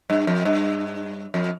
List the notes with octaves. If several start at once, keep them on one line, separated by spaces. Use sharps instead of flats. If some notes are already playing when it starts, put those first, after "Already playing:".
G2
F2
G2
F2